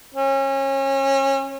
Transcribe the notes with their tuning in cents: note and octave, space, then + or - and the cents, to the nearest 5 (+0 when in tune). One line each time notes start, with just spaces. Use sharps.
C#4 -30